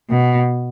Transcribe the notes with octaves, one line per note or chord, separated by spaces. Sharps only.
B2